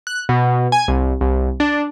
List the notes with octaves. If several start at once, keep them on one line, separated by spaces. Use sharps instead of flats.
F#6
B2
G#5
C2
C2
D4